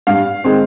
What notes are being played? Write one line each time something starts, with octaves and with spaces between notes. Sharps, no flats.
G2 F5
D#3 G#3 C4